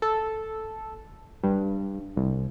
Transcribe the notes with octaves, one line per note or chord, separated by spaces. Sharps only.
A4
G2
C2